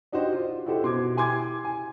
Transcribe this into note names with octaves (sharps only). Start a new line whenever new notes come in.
D4 D#4 F#4 G4 C5
F4
D#4 E4 F#4 G4 A4 C5
B2 C6 D6 G#6
E4 G4 G#5 C6 D6 G#6
G#5